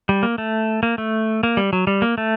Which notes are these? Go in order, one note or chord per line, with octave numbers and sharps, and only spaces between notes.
G3
A#3
A3
A#3
A3
A#3
G3
F#3
G3
A#3
A3